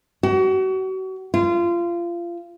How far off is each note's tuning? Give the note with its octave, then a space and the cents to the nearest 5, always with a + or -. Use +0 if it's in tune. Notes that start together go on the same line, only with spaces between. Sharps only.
F#4 +35
F4 -25